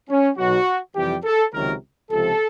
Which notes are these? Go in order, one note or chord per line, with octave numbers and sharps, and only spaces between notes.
C#4
B1 B2 F#3 F#4
F2 C3 E3 G3 G4
A4
C#2 C3 D#3 F#3 A#4
C#2 C3 F3 A4